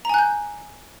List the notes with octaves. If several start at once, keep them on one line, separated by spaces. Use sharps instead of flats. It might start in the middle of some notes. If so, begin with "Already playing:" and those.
G#5 A#5 F#6 G6